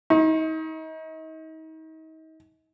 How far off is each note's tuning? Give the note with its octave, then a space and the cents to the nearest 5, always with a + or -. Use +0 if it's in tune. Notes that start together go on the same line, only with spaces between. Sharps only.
D#4 +35 C#6 -40